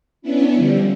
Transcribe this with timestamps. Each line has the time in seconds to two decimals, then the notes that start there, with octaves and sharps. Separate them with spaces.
0.22 B3 C#4 D4 E4
0.54 D3 F3 G3